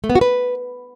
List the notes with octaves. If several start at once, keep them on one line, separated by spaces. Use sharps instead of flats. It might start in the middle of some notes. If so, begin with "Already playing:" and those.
A3
B3
F#4
B4